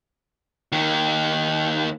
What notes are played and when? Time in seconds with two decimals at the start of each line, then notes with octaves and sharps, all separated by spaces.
0.72 D#2 D#3